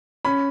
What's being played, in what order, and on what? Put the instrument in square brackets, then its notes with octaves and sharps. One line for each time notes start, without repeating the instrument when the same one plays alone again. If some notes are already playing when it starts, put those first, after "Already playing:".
[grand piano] C#4 [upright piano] B5